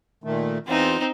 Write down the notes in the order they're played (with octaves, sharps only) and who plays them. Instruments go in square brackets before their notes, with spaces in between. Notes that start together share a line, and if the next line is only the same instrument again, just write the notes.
[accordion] A#2 D#3 A3
[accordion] E2 E3 F4 [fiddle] C4 D#4